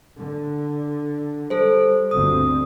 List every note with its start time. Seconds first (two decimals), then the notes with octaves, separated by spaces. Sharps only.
0.16 D3
1.50 G3 A4 C5
2.11 G1 D2 C4 D#6